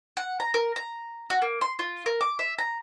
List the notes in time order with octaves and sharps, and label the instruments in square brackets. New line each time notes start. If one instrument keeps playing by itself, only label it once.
[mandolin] F#5
A#5
A#4
A#5
F#4
A#3
C6
F4
A#4
D6
E5
A#5